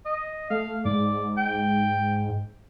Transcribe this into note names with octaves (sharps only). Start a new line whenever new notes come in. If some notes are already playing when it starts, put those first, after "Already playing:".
D#5
A3 F5
G#2 D5
G5